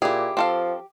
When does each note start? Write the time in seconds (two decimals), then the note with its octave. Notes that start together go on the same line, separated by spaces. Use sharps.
0.02 A#2 E4 G4 G#4
0.37 F3 C4 A4 F5